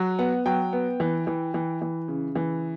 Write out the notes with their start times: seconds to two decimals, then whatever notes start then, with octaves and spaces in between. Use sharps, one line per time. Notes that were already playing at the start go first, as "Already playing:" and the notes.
Already playing: F#3
0.19 B3 F#5
0.46 F#3 G5
0.73 B3
1.00 E3
1.27 E3
1.54 E3
1.82 E3
2.08 C#3
2.35 E3